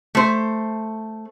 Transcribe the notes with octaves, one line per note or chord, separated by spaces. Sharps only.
A3 C5